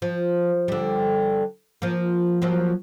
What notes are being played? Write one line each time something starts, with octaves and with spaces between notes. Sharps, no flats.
F3
D3 G3
F3 A#3
F3 F#3 A#3